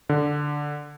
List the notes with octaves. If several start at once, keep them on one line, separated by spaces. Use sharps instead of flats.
D3